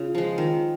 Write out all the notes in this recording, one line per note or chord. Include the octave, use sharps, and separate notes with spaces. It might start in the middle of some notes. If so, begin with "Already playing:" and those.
Already playing: C#3 F4
F3 G#3
D#3